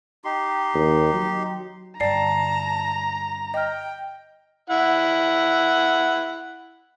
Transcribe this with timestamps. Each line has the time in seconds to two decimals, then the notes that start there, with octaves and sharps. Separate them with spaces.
0.24 D#4 G4 C6
0.74 D#2
1.14 F#3
2.00 G2 D3 D5 G5 A5 A#5 C7
3.54 D#5 G5 F6
4.70 E4 F#5